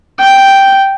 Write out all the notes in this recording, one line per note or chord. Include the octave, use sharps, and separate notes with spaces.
G5